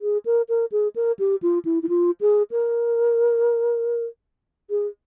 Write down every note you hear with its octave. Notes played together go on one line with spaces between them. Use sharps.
G#4
A#4
A#4
G#4
A#4
G4
F4
E4
E4
F4
G#4
A#4
G#4